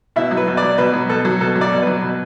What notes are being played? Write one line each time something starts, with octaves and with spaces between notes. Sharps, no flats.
B2 E4
F#3
B4
B2
F#3 D5
B2 B4
F#3
B2 A4
F#3
B2 A4
F#3
D5
B2
F#3 B4
B2